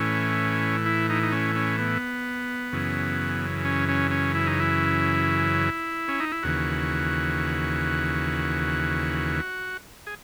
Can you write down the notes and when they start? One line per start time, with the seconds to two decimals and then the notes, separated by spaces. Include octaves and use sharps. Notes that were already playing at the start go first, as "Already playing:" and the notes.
Already playing: A2 E3 C#4
0.86 E4
1.10 D#4
1.23 D#4
1.32 C#4
1.56 C#4
1.79 B3
2.72 F#2 C#3 E3
3.65 C#4
3.89 C#4
4.11 C#4
4.35 E4
4.47 D#4
4.60 E4
6.08 C#4
6.20 D#4
6.32 E4
6.43 D#2 C#3 E3 F#4
10.07 G#4